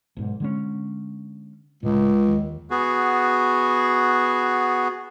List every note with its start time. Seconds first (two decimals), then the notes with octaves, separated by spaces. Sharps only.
0.17 B1 G#2
0.40 D3 G#3 C#4
1.83 C#2 A2 C#3
2.28 D#2
2.70 B3 F#4 G#4